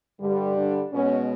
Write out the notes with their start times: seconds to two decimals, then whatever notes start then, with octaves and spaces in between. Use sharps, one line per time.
0.20 G2 D3 G3
0.56 D3 D4
0.92 B2 G#3 B3 C#4